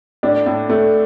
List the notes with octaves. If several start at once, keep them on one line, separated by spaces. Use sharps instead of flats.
A2 D4
A2
A2 A3